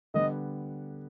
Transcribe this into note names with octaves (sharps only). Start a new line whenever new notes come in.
D3 G3 B3 D#5